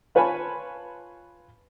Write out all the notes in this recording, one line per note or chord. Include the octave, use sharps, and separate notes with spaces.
F4 B4 C#5 G#5 A5 B5